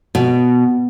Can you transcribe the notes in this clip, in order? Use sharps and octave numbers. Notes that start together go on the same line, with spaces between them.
B2